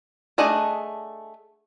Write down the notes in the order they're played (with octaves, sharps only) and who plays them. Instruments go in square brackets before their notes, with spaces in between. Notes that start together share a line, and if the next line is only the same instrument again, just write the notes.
[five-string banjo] A3 D4 G#4 D#5 F#5